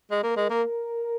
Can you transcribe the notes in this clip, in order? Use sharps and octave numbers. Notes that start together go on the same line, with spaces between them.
G#3
A#3
G#3 A#4
A#3